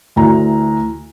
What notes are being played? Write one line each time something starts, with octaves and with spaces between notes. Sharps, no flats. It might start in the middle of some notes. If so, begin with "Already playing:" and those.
D2 E3 A#5